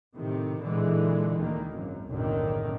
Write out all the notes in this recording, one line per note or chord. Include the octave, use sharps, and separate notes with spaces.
A2 C3 D#3
A#2 D3 E3 G#3
D2 D#3 A#3
G#1 F#2
F#1 B1 A2 D3 D#3